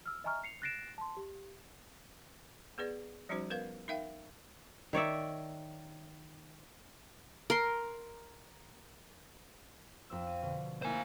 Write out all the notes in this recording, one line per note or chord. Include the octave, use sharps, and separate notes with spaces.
E6 F6
D#5 E5 G#5 A#5 C#6 F6
C7 C#7 F7
F#6 A6 A#6 C7 D7 E7
A5 C6
G4
B3 G#4 B4 D5
F3 G3 C#4 D#4 F#4 C5
B3 A#4 B4 F5
D#4 A#4 E5 F5 G5
D#3 C#5 D5 E5
A#4 C6
F2 C4 E6
D#7
B2 D3
A#3 E4 C5 G#5